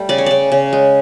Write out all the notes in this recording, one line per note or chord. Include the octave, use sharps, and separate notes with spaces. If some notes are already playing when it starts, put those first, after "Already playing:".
Already playing: G3 A3
C#3 D5
C#5
C#3 D5
C#3
G#3